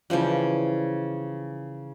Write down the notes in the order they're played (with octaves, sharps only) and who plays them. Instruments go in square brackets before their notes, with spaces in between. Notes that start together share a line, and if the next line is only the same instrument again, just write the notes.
[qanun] C#3 E3 F3 G3